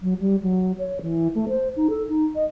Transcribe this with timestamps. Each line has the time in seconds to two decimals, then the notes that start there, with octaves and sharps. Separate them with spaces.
0.01 F#3
0.20 G3
0.42 F#3
0.78 C#5
1.02 E3
1.35 A3
1.49 C5
1.76 D#4
1.90 A4
2.09 D#4
2.35 D#5